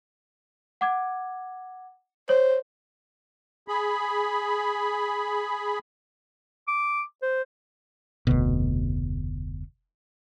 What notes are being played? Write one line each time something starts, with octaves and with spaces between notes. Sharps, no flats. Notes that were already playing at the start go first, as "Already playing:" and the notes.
F#5 D6 G#6
C5 C#5
G#4 B5
D6
C5
F1 D2 B2